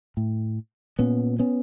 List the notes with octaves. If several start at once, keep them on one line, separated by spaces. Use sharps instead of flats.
A2
A#2 B3 C#4
B3 C#4